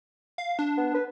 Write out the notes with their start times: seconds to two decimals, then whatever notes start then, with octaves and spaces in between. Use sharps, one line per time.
0.38 F5
0.59 D4
0.77 B3
0.95 B4